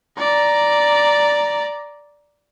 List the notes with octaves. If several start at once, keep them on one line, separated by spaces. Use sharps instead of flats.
D5 A#5